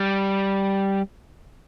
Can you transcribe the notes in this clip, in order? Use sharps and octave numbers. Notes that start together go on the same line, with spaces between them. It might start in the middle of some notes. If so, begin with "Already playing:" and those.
Already playing: G3